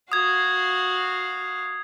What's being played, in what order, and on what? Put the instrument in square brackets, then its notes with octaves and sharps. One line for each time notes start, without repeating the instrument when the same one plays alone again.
[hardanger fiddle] F#4 F5 [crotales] D#6 G#6